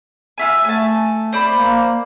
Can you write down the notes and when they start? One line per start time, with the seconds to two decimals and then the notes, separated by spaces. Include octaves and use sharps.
0.38 F4 E5 G#5
0.65 A3 G#5 A5
1.33 C5 D5 B5
1.56 A#3